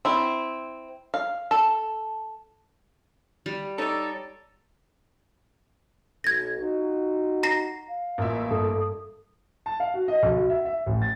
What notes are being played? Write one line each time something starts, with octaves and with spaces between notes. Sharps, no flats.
C4 E4
F5
A4
G3
D#4 A4 C#5 D5
B1 G#6 A#6
D#4 F4 F#4
A#5 A#6 C7
F5
A1 A#3 F4 E5
G2 A4 D#6
A5
F5
F#4
D#5
B1
F#4
E5
E5
A1
A6